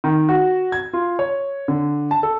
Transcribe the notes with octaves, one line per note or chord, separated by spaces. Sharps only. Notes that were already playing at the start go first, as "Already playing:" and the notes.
D#3
F#4
G#6
F4
C#5
D3
A5
A4